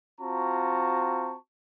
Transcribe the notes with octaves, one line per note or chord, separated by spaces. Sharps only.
C4 F4 F#4 A5 A#5 C#6